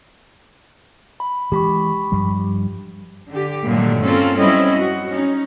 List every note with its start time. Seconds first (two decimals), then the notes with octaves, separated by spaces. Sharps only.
1.20 B5
1.52 E3 G#3 G4 B5 C#6
2.12 G2 F3 G3
3.31 D3 G4
3.67 G2 A#2 D3 D#3 F#3 A3
4.04 A#3 C4 C#4 F4 A4
4.38 F#3 G3 C4 C#4 E4 D#5
4.78 F#4
5.10 C#4 D#4